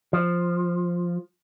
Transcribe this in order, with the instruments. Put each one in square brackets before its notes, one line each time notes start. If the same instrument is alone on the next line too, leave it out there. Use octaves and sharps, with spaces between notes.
[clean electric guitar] F3